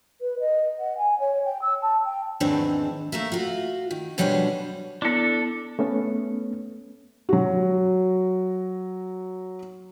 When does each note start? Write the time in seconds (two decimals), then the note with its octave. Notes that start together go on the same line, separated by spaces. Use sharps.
0.21 B4
0.40 D#5
0.80 F#5
0.98 G#5
1.20 C#5
1.46 G5
1.62 E6
1.82 A5
2.05 G5
2.40 E2 G#2 D#3 E3 C4 D4
3.12 A3 A#3 A#4 E5
3.32 F4 F#4
3.91 D#3
4.18 B2 F#3 G3 D4 G#4 C5
5.02 B3 D4 E4 A4
5.79 A3 B3 C#4
7.29 F#3 F#4